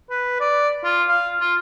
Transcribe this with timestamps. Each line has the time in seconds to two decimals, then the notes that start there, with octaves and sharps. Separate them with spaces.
0.10 B4
0.40 D5
0.84 F4
1.09 F5
1.41 F4